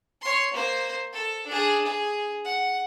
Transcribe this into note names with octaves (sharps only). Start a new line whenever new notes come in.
C#5 C6
A#3 C5
A4
D4 G#4
G#4
F#5